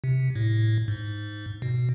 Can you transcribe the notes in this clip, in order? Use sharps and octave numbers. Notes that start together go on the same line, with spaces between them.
C3
A2
G#2
B2